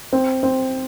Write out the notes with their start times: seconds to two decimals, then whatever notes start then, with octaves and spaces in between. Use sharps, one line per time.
0.13 C4
0.43 C4